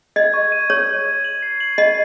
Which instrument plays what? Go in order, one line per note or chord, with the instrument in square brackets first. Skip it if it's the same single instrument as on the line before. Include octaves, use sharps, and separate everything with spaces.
[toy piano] D#5 [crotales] G#6
[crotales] C#6
D#7
[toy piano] C#5 [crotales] C#6
[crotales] C#6
G#6
F#7
C7
F#7
[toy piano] D#5 [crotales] C7